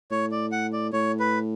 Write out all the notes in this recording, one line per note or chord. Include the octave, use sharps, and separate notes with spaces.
A2 C#5
D5
F#5
D5
A2 C#5
B4